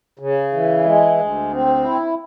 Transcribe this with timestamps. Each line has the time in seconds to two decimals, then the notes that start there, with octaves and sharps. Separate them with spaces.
0.19 C#3
0.53 E3
0.85 G#3
1.18 D2
1.53 C4
1.84 E4